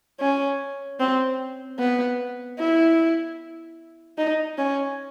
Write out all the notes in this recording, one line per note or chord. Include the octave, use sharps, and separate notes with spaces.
C#4
C4
B3
E4
D#4
C#4